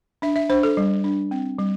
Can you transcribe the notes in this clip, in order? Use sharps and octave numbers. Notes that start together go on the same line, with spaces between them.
D4 E5
E5
D4 C5
A4
G3
D4
C4
G3